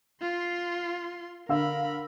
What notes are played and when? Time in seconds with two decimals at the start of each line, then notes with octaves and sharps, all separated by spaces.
0.22 F4 C6
1.49 D3 A#4 F5 B5 E6